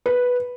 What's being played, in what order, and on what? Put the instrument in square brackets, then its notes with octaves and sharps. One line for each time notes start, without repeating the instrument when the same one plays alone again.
[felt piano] B4